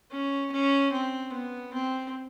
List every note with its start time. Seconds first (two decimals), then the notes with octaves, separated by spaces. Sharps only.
0.11 C#4
0.52 C#4
0.92 C4
1.33 B3
1.74 C4